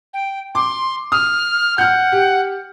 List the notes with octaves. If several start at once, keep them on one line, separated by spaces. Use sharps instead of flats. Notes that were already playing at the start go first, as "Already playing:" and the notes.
G5
C6 D6
D#6 F6
F#5 F6 G6
G4